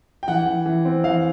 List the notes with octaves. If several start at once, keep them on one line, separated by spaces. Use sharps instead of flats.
G5
E3 F#5
E3
E3
C4
E3 F5